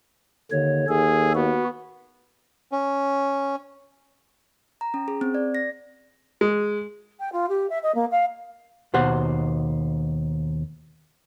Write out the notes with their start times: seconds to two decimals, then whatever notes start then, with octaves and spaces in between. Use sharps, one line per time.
0.51 D#2 D3 C#5
0.89 D#2 G#4 A4
1.35 B3 F#4
2.72 C#4
4.81 A#5
4.94 C#4
5.08 G#4
5.21 C4
5.34 D5
5.55 A#6
6.41 G#3
7.19 G5
7.32 F4
7.49 G4
7.69 E5
7.82 D#5
7.94 A#3
8.11 F5
8.94 D#2 B2 C5 F#5